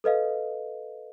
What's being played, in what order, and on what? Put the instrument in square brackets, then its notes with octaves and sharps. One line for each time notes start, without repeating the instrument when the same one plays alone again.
[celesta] A4 B4 D#5 F5